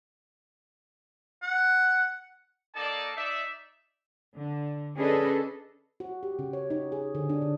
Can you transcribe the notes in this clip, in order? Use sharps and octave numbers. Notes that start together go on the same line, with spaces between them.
F#5
A#3 D#4 A4 D5 A5
D#4 D5 E5
D3
C#4 D4 G#4 A4 B4 D#5
F#4
G4
C#3
C#5
D#4
G#4
D3
D4
D3